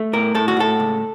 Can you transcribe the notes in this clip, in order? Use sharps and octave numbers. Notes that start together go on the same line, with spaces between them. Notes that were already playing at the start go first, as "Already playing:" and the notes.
Already playing: A3
A2 A#4
A2 A4
F#4
A2 A4
C#2